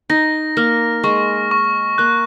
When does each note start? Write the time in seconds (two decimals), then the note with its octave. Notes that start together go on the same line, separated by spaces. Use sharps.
0.10 D#4 A#6
0.57 A#3 F6
1.04 G#3 C#6
1.51 C#6
1.98 A#3 F#6